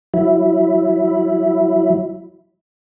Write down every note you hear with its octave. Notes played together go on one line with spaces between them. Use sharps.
F#3 E4